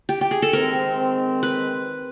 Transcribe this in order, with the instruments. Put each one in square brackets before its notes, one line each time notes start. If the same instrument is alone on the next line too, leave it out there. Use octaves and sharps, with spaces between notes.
[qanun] G4
G4
G#4
A4
[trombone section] D#3 G#3 C4 [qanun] A#4
[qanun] B4